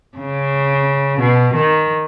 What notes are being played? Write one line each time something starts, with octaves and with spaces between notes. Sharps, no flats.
C#3
B2
D#3